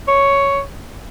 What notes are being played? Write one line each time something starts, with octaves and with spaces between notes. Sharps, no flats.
C#5